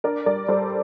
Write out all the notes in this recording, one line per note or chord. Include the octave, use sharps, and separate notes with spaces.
D4 A#4 D5
G3 A#4 D5
G3 A4 C5